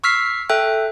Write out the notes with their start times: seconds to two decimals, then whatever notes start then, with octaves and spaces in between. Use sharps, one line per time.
0.04 C#6 E6 F6 B6 C7
0.49 A4 E5 G5 F#6